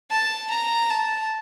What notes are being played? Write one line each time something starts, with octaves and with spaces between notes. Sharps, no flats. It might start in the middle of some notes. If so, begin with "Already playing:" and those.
A5
A#5
A5